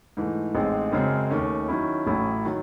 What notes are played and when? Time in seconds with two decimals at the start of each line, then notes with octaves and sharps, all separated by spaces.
0.17 G#2 E3 A3
0.55 A1 A2 G#3 C4 D#4
0.92 F#2 C#3 G#3 C4
1.31 D#2 D#3 A3 C#4
1.68 D#3 F#3 C#4 E4
2.07 A1 A2 F#3 C#4 E4
2.45 D#3 F#3